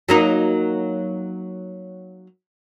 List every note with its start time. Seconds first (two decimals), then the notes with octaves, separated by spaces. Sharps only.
0.08 F#3 A#3 D#4